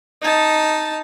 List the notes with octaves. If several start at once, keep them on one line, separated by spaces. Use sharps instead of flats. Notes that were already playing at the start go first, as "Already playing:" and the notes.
D#4 A5